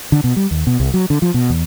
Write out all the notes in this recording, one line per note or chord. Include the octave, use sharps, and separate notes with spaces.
D3
B2
G3
D#2
B2
C2
F#3
D3
F3
B2
E2